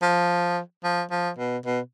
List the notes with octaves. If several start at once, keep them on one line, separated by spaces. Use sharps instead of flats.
F3
F3
F3
B2
B2